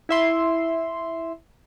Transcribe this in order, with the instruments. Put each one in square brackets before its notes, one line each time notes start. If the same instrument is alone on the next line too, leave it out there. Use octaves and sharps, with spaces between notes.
[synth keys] E4 E5 C6